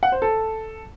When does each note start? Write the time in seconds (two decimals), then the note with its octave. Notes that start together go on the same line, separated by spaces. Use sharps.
0.03 F#5
0.12 C5
0.22 A4